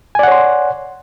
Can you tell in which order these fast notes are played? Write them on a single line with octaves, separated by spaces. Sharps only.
G#5 D5 F#5 C#5 C6